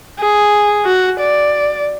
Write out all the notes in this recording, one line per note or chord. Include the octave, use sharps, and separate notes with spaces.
G#4
F#4
D5